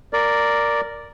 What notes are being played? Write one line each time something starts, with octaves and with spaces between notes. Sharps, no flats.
A#4 D5